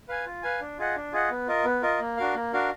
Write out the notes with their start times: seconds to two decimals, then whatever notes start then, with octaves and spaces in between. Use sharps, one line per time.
0.08 B4 F5 G#5
0.26 F4
0.43 B4 F5 G#5
0.61 D4
0.78 F4 G#4 D#5 F#5
0.96 D4
1.12 F4 G#4 D#5 F#5
1.30 B3
1.47 F4 A#4 D#5
1.65 B3
1.82 F4 A#4 D#5
2.00 A#3
2.17 D4 F#4 A#4 F5
2.35 A#3
2.53 D4 F#4 A#4 F5